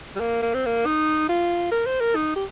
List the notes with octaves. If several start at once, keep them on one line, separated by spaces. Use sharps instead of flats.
G3
A#3
A#3
C4
A#3
D#4
F4
A#4
C5
A#4
D#4
G4